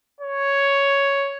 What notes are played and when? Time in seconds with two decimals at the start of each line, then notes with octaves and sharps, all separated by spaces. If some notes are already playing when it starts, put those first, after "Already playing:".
0.21 C#5